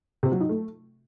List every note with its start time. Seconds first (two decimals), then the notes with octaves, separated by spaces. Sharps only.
0.23 C3
0.32 F#3
0.40 D#4
0.49 A3